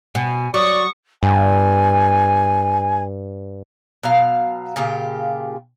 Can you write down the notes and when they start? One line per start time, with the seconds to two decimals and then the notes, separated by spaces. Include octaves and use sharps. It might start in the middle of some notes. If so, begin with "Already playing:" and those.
0.15 B2 G#5
0.54 F#3 D5 C#6 D#6
1.23 G2 G#5
4.03 B2 F#3 F5
4.76 A#2 C#3 F4 G4